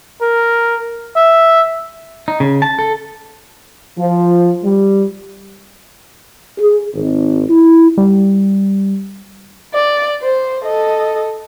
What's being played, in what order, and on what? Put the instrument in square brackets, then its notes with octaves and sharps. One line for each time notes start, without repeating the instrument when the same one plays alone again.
[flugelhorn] A#4
E5
[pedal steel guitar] D#4
C#3
A5
A4
[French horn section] F3
G3
[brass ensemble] G#4
G#1
E4
[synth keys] G3
[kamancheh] D5
C5
A4 D#5